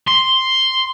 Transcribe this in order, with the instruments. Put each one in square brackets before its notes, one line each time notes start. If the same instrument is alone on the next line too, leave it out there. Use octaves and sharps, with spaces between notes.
[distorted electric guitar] C6